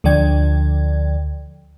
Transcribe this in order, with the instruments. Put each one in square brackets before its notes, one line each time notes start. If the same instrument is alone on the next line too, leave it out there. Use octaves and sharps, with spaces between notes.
[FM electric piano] D2 D3 F3 D5 G5 G#6